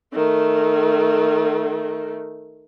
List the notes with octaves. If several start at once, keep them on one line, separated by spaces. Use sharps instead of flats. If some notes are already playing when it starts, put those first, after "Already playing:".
D#3 A3